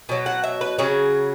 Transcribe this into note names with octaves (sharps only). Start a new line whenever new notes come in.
B2 F#3
F#5
E5
B4
C#3 F#3 G#4